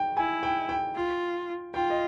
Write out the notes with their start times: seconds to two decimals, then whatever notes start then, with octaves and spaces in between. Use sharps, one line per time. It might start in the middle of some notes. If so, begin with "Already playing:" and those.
Already playing: G5
0.17 E4 G#5
0.43 G5
0.69 G5
0.96 F4
1.74 F4 G5
1.90 D#5